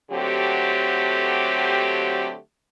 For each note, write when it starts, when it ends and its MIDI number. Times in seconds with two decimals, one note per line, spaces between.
0.11 2.35 50
0.11 2.35 54
0.11 2.35 57
0.11 2.35 60
0.11 2.35 67